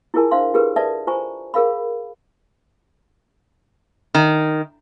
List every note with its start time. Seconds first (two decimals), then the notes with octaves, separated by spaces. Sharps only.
0.14 E4 F4 G#4 A#4 G#5 A5
0.31 D4 C5 E5 F5 C6
0.54 F4 G4 G#4 A#4 B4
0.76 A4 B4 D5 E5 A5
1.07 F4 C5 G#5 A#5 C#6
1.54 G#4 A#4 F5 B5
4.15 D#3